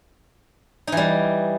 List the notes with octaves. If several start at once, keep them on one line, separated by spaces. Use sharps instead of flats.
E3 G3 D#4